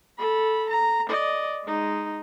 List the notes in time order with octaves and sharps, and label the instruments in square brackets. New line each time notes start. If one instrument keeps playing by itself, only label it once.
[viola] A4 B5
A#5
D5 D#5
G#3 D#4